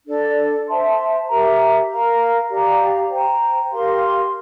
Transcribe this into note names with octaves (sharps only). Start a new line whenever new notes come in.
D4 A4 D5
C5 E5 A5 C6
G4 A#4 E5 A#5
A#4 F5 A#5
G4 D5 F5 A#5
C5 G5 A#5
G4 A#4 F5 C6